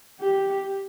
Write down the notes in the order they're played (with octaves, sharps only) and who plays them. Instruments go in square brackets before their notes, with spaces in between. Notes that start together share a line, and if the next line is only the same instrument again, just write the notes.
[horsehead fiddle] G4